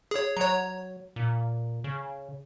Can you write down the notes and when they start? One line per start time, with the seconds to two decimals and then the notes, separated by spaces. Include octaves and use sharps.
0.11 G#4 C#5
0.37 F#3 C#5 A#5
1.16 A#2
1.84 C#3